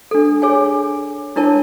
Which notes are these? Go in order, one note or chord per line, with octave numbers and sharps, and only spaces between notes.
D4 A4
G#4 C#5 G#5
D4 E4 A#4 C#5 A5